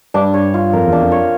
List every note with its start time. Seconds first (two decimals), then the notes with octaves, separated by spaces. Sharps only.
0.14 G2 D4
0.34 C#5
0.54 F4
0.73 F2 A#4
0.87 E2
0.92 D4
1.03 F2
1.12 C#5